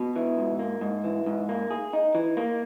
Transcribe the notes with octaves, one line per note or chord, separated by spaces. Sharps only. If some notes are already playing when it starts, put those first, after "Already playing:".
Already playing: B2
E3
G#2
A#3
G#2
E3
G#2
A#3
G#4
D#4
E3
A#3